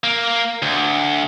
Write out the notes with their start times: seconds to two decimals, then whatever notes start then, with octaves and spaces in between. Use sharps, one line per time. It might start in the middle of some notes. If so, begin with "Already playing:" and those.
0.04 A#3
0.62 D2